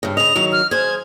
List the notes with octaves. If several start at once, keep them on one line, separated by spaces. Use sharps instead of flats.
G2 C#3
C#3 D#5 F7
D#3 F#3
F6
G#4 C5 G#6